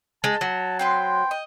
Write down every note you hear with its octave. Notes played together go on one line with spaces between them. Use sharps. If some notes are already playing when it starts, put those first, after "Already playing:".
G#3 A5
F#3
C4 B4 G5 C6
D#5